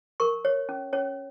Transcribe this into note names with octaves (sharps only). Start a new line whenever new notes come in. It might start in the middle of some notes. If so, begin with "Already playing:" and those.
A#4 C#6
C#5
C#4
C#4 C#5